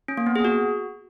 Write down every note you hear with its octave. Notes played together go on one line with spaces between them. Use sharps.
C#4
A#3
B3
G#4
F#4